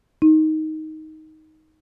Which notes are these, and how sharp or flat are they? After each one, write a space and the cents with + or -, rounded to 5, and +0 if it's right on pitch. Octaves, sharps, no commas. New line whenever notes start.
D#4 +10